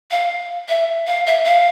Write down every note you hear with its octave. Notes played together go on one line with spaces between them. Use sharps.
F5
E5
F5
E5
F5